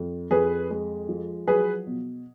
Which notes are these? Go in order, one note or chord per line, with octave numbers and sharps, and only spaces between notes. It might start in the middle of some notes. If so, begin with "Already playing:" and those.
Already playing: F2
F2 G#4 B4
G#3
F3
F#3 G#4 B4
B2